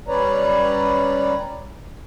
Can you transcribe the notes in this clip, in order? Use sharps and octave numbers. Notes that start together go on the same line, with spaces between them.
G3 C#4 B4 C#5 D5 A#5